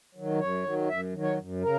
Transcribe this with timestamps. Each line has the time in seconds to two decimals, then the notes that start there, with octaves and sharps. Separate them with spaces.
0.15 D#3 F#3
0.39 F#2 C#5
0.64 D#3 F#3
0.89 F#2 E5
1.13 D#3 F#3
1.22 C#5
1.38 F#2
1.63 C#3 A#4